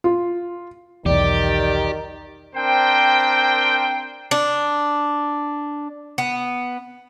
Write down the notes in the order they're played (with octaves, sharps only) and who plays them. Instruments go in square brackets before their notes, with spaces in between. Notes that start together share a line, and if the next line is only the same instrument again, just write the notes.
[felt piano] F4
[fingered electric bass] B1 E2 [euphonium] D#3 [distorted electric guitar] G4 [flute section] D5
[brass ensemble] C4 D4 A#4 C5 G5
[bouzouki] D4
B3